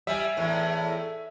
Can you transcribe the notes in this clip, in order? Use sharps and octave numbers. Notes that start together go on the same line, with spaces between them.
G3 E5 G#5
E2 A2